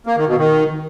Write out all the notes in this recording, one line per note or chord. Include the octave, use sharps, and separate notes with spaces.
A#3
D#3
B2
D#3